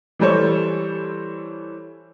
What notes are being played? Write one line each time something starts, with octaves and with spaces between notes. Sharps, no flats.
E3 G3 A4 C5 C#5